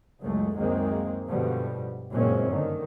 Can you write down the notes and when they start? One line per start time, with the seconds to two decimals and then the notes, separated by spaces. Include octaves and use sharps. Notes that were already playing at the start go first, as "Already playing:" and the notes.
0.21 F#1 C#2 F#2 G#3 A3
0.57 C#2 F#2 D#3 G#3 A#3 C4
1.29 G2 B2 D3 F3 G3
2.12 F#1 G2 A#2 G#3 C4 C#4
2.52 D3 D#3